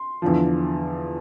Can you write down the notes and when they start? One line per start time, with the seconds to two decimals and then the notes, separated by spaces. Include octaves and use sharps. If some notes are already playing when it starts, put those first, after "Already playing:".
Already playing: C6
0.22 E2 D3 F3